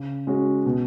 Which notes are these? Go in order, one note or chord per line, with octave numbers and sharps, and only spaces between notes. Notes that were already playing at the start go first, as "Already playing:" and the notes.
Already playing: C#3
G#3 C#4 F#4
B2